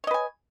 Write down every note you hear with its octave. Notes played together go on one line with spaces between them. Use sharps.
B4 C#5 D#5 G#5